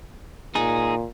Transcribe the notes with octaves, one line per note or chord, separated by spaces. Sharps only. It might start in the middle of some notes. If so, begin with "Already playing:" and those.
A#2 D#4 G#4